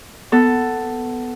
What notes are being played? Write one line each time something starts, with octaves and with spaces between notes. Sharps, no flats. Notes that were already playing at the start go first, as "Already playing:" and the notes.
B3 A4